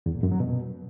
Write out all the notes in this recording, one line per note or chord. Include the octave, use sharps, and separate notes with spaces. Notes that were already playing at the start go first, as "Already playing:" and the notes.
E2
A#2
F#2
F#3
B2